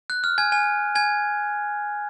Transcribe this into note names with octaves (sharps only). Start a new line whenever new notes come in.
F#6
F6
G#5 G#6
G#5 G#6
G#5 G#6